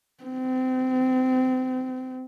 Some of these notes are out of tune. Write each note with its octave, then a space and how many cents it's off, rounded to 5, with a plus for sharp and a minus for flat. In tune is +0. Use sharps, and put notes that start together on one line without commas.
C4 -30